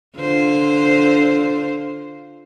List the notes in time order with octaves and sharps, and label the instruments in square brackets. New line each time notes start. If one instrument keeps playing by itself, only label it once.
[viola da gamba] D3 F4 C5